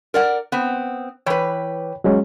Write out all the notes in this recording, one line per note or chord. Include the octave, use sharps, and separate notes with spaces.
A#4 D5 F#5
B3 C4
E3 B4 C#5 G5 B5
F#3 G#3 C#4